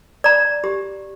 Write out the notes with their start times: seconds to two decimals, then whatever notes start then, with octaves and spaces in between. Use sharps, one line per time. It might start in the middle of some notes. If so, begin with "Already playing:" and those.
0.24 D5 A#5
0.64 G4